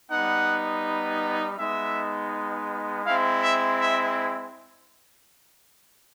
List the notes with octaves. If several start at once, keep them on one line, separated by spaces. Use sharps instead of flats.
G3 B3 D#4 F#5
G#3 B3 D#4 E5
G#3 C4 E4 F5
E5
E5